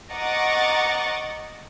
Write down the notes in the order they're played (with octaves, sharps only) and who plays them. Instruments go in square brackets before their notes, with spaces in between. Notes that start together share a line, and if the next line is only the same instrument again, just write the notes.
[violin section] D#5 F#5 A#5 C#6 D6 A6